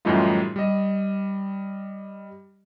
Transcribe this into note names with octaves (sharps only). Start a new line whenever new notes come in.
F#2 A2 E3 G3 D#4 F4
G3 D#5